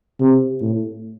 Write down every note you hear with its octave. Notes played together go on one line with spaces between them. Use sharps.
C3
A2